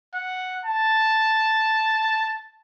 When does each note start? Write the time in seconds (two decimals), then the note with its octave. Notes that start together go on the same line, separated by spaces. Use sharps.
0.14 F#5
0.65 A5